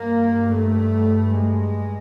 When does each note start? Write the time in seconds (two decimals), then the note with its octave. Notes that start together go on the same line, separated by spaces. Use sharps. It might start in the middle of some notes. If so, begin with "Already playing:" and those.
Already playing: G2 A#3
0.54 A3
1.35 G#3